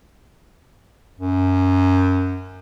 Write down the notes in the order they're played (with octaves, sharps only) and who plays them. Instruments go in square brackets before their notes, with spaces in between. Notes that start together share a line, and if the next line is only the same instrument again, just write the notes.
[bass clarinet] F#2